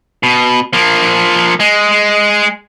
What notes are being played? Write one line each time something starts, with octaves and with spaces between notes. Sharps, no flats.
B2
F3 A#3
G#3